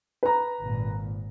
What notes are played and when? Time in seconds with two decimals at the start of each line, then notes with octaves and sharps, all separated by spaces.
0.23 B4 A#5
0.61 G#1 A#2